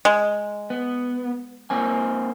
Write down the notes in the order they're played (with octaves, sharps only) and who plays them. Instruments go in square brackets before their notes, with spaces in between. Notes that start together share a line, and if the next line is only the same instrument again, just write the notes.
[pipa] G#3
[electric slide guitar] B3
A#3 C4 G#5